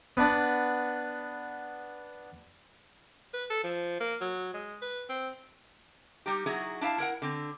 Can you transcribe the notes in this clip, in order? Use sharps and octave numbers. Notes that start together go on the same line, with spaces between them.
B3 D4
B4
A4
F3
A#3
F#3
G#3
B4
C4
G3 D#4 G4
F#3 D#4 E4 F#4 G#4
D4 E4 D5 F5 A5
E4 A#4 F#5
D3 C4